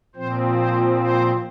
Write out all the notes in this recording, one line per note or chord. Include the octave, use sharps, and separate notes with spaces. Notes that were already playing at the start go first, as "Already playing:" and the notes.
A#2 F3 C4 C5
C5
C5